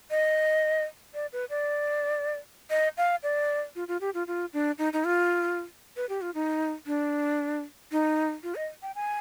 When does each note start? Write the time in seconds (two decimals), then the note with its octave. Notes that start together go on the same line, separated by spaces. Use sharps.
0.11 D#5
1.14 D5
1.33 B4
1.50 D5
2.70 D#5
2.98 F5
3.23 D5
3.76 F4
3.88 F4
4.01 G4
4.14 F4
4.27 F4
4.53 D4
4.78 D#4
4.93 D#4
5.05 F4
5.97 B4
6.09 G4
6.22 F4
6.34 D#4
6.86 D4
7.92 D#4
8.43 F4
8.55 D#5
8.83 G5
8.95 G#5